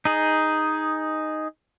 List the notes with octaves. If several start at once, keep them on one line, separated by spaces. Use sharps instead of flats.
D#4 G#4